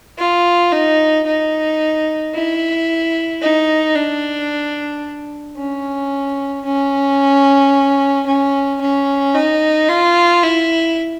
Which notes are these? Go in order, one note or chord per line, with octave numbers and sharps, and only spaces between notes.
F4
D#4
D#4
E4
D#4
D4
C#4
C#4
C#4
C#4
D#4
F4
E4